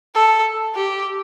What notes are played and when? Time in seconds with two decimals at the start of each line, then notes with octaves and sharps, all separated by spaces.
0.14 A4
0.75 G4